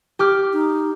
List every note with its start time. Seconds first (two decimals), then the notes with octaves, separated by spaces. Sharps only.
0.19 G4 D6 F6
0.53 D#4